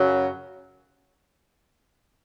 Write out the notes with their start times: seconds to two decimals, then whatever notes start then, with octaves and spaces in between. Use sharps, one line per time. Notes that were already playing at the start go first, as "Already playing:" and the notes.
Already playing: F#2 C#3 F#3